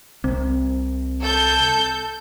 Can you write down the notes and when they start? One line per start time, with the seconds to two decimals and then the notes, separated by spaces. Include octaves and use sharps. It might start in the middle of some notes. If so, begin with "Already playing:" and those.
0.24 C2 C4
1.21 A4 G6